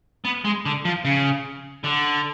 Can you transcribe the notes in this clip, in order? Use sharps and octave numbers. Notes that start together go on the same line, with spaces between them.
B3
G#3
D3
F3
C#3
D3